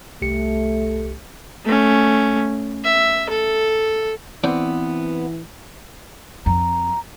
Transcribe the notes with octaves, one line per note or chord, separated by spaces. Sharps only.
C2 A3 G4 C#7
A3 C#4
E5
A4
E3 B3 C4 D5
F2 A#5